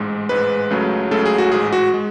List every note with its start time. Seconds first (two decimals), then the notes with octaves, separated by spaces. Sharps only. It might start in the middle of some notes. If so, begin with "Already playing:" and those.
Already playing: A1 G#2 G#3
0.29 A1 G#2 G#3 B4
0.70 C#2 C#3 F#3 A3
1.11 C#2 C#3 F#3 A3 A4
1.25 G#4
1.38 F#4
1.52 A1 G#2 G#3 G#4
1.72 F#4
1.94 G#3